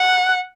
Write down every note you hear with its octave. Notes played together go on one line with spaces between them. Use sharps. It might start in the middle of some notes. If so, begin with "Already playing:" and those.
Already playing: F#5